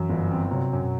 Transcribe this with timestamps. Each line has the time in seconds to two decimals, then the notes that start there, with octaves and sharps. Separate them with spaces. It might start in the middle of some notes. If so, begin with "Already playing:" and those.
Already playing: F#2 E3
0.10 G1
0.31 C4
0.51 C3 F#3
0.73 F#2
0.83 B2